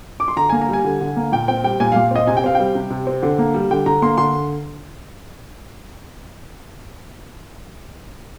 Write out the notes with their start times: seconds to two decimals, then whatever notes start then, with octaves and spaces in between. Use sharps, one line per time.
0.20 D6
0.28 C6
0.36 D3 A#5
0.49 A#3 G#5
0.61 A#5
0.69 G3 G#5
0.85 D3
1.01 D3
1.16 A#3
1.32 A#2 G5
1.48 C4 G5
1.64 G3 G5
1.80 A#2 G#5
1.92 A#2 F5
2.11 C4 D#5
2.27 C3 G#5
2.37 G5
2.44 C4 F5
2.55 G3 G5
2.75 C3
2.90 C3
3.07 C4
3.23 D3
3.38 A#3
3.54 G3
3.71 D3 G5
3.86 D3 A#5
4.02 A#3 C6
4.18 D3 C6